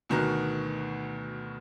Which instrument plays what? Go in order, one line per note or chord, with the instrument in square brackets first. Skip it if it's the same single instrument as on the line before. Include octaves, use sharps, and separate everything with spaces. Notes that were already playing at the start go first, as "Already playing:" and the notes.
[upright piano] D2 B2 D#3 B3 F#4 A#5